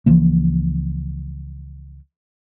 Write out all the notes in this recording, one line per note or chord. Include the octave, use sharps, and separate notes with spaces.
C#2 E3 F3 A#3